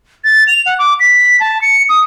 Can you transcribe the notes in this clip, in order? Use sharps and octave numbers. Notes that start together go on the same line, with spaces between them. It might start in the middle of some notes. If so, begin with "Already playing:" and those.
A6
F7
F#5
D6
B6
A5
C#7
D#6